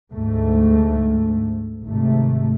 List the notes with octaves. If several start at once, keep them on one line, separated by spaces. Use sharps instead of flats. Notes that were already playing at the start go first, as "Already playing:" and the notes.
D2 G#2 A3
G#1 C3 A3